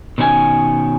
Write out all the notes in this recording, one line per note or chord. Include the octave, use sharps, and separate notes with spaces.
B2 D#3 C#4 D4 G#5